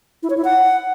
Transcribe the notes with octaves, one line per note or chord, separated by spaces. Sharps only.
E4
C#5
E4
F#5